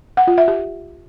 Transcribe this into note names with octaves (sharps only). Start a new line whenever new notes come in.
F#5
F4
E5
G4